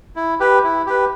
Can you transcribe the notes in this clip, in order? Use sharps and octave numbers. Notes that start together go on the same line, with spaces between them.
E4
G4 B4
E4
G4 B4